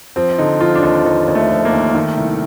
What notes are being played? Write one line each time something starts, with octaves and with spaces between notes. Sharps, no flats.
F3 C4
D3 D#4
F3 F4
D4
D#2 D#4
D#2 D#4
D#2
A3
F3
A#3
D#2
D#3 A3
C2